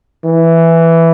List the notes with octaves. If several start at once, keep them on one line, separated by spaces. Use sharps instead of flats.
E3